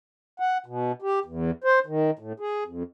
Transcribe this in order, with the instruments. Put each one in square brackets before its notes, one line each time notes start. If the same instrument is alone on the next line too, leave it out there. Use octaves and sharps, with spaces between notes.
[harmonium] F#5
B2
G4
E2
C5
D#3
A2
G#4
F2